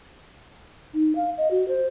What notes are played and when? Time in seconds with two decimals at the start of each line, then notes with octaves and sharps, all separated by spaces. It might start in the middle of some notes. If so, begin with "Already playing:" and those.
0.94 D#4
1.16 F5
1.38 D#5
1.51 F#4
1.68 C5